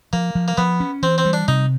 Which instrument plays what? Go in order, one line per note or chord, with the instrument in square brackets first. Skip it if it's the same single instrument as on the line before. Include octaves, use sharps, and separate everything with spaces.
[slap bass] F3 [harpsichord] A#3
[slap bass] F3
[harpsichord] A#3
[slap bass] F3 [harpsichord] B3
[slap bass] C#4
[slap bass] E3 [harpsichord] C4
[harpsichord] C4
[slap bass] G3
[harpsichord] D4
[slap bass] C3 [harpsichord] D#4